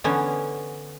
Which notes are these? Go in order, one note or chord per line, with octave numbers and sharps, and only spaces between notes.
D3 E3 B3 C#4